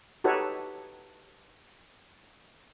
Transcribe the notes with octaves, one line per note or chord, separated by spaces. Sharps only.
D#4 F#4 G4 A4 B4 C#5